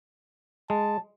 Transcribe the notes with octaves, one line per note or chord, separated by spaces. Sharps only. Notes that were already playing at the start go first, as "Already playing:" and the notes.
G#3 A5